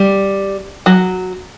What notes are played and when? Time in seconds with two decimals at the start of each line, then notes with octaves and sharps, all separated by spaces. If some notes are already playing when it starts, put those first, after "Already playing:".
Already playing: G3
0.86 F#3